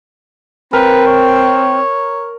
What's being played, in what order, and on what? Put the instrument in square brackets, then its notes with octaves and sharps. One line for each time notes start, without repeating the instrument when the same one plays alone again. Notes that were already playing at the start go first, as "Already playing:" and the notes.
[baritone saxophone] C4 [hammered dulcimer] A#4 [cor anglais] B4
[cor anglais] C#5